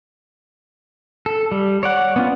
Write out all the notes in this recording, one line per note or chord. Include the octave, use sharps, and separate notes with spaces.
A4
G3
C#5 D5 F#5
B3 C#4 F4